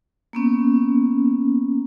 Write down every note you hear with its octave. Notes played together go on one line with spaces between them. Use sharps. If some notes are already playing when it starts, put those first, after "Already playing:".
A#3 B3 C#4